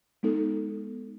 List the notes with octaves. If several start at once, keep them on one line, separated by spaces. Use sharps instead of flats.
G#3 B3 D#4 A4